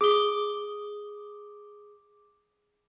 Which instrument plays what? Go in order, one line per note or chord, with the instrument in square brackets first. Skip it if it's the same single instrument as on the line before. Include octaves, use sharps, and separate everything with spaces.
[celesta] G#4 D#6 G7 [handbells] D6